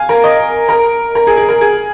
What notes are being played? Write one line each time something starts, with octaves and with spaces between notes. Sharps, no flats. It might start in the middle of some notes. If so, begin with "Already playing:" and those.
Already playing: F5 G#5
A#4
D#5
A#4
A#4
G#4
G#4
A#4
G#4